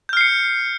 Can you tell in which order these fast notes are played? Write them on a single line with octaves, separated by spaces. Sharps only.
G6 F6 C7 C#7